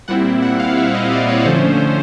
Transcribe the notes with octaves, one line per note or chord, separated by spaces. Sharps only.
A#2 G3 C4 E4 F#5
F#5
F5
E5
D#5
D5
C#5
D3 F3 A3 C#4 C5